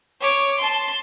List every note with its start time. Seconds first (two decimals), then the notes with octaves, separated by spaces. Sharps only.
0.20 C#5 D6
0.58 A5 C6